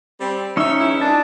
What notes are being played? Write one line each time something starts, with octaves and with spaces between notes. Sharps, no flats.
G3 C4
G#2 C#4 D#4 E5
E2 E4
F#2 G#3 D4 A5